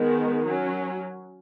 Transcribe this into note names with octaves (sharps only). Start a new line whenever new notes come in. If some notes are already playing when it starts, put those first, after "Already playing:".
Already playing: D#3 G#3 B3
F#3 C#4